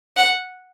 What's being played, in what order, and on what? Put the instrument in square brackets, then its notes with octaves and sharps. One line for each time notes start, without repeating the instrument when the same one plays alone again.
[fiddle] F#5